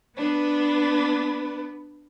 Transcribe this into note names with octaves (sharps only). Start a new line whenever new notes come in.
B3 D4 B4